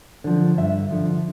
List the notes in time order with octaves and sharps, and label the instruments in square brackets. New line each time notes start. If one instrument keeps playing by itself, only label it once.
[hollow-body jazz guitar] D3 F3
G2 E5
D3 F3